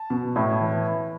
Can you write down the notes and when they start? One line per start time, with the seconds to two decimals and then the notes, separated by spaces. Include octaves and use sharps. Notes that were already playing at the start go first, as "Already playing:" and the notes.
Already playing: A5
0.10 B2
0.36 A2
0.61 E3